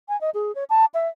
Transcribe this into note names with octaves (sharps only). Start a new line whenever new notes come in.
G#5
D#5
G#4
C#5
A5
E5